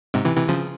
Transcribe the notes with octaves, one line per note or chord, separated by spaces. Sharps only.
G#2 C3
C3 E3
C3 E3
C#3 F3